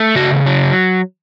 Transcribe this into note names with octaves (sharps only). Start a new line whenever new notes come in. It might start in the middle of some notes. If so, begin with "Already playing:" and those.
Already playing: A3
C#3 F#4
F#3